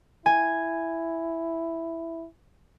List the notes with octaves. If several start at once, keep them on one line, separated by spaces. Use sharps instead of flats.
E4 G#5